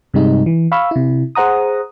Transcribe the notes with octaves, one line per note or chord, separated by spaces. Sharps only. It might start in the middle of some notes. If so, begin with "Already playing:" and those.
G2 C3 G3 G#3 D#4
E3
F5 B5 C#6 E6
C3 E4
G#4 C5 F#5 A#5 D#6